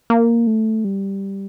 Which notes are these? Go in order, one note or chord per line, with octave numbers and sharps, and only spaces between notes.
A#3
A3
G3